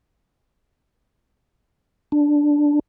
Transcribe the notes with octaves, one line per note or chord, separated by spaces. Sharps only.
D4